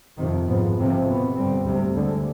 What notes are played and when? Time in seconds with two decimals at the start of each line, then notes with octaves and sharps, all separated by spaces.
0.19 F2 C3 D#3
0.48 G#2 F3 B3
0.78 F2 C3 F3
1.07 B2 B3
1.36 G2 D3 G3 C4
1.66 D2 C3 G3
1.95 D2 D3 G#3